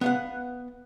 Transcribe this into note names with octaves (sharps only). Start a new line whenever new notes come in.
B3 F5 F#5